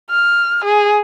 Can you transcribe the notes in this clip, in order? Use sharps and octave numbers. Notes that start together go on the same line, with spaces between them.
F6
G#4